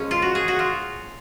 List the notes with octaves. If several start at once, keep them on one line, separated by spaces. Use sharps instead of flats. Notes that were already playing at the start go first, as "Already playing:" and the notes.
Already playing: A#2 F3 G#3 C#4
F4
F#4
G#4
F#4
F4